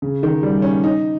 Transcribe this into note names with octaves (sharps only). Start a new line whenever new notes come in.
C#3
D#3
G3
C#4
D#4